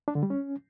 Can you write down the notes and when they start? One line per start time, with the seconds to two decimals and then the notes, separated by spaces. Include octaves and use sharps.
0.08 D4
0.15 D3
0.23 G3
0.30 C#4